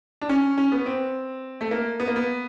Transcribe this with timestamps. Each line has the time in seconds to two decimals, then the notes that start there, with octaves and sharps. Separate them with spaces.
0.22 D4
0.29 C#4
0.58 C#4
0.72 B3
0.86 C4
1.61 A3
1.71 A#3
2.00 B3
2.08 A#3
2.16 B3